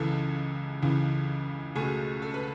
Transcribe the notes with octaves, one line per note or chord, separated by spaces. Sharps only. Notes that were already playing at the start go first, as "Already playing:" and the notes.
Already playing: C#2 C#3 E3 A4
C#2 C#3 E3
C#2 B2 A3 G#4
A4
B4